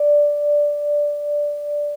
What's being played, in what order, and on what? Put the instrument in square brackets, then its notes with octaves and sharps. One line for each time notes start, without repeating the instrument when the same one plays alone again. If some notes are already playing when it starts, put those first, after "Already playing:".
Already playing: [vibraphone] D5